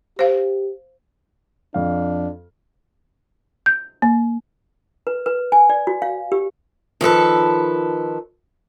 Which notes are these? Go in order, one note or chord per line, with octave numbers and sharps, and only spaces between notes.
G4 C5 F5
F2 D4 F5
G6
A#3
B4
B4
G#5
D5
F#4
F5
G4
D#3 F3 A4 B4